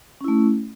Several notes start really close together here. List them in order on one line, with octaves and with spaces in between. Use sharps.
C#4 E4 A3